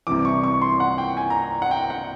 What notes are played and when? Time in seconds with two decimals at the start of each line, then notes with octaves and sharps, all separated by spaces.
0.07 C2 C3 E3 D6
0.25 C#6
0.44 C#6
0.62 C6
0.80 F#5
0.98 G5
1.17 G#5
1.30 A#5
1.62 F#5
1.71 G5
1.90 F#5